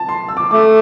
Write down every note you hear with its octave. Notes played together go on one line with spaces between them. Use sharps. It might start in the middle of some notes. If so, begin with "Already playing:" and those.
Already playing: A5
C6
E6
D6
A3 D6